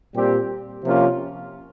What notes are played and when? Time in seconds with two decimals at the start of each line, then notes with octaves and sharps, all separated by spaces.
0.14 A#2 G3 C4 G4
0.83 C3 F3 A#3 C#4 F4